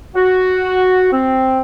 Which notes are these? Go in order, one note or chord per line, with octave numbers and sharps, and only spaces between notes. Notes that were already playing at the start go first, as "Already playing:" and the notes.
F#4
C4